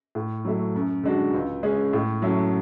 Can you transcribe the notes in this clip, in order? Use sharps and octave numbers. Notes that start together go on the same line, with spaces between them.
A2
F#3 A3 E4
F#2
D3 G#3 D4 F#4
C#2
C#3 G#3 C#4 G#4
A2
F#3 C#4 E4 A4